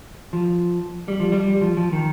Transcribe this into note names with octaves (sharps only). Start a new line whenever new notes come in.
F3
G3
F3
G3
F3
F3
D#3